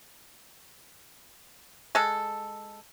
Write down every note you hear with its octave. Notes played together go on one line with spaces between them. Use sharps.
G#3 A4